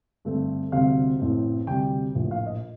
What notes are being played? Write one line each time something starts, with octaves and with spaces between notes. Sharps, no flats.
G2 D3 A3 C4
D2 C3 G3 C4 F5
A1 A2 A3 C4
D2 C3 G3 G5
A#1 A2 F3
F5
D#5